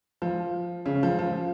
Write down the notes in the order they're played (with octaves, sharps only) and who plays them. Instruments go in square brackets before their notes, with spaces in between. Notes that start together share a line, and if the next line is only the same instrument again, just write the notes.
[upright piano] F3
C#3
F3
F3